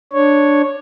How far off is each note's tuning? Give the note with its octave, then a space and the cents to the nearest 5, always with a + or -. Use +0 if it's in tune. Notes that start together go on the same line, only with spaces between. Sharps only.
D4 +0 C#5 +0